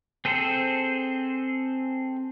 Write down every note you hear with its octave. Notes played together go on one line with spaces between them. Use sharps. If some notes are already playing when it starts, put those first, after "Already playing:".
C4 G#4 A4 C5